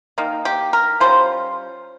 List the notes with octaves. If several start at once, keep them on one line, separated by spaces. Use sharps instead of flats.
D#3 A#3 D#4
G4
A#4
G3 C#4 F4 C5